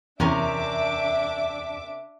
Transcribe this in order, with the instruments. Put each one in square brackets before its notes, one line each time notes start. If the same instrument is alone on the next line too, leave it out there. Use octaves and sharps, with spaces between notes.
[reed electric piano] E2 [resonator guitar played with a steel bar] C3 C#4 A#4 [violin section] D4 E5 D6